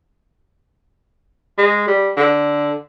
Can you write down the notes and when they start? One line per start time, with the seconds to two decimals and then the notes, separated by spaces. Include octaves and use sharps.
1.58 G#3
1.88 G3
2.17 D3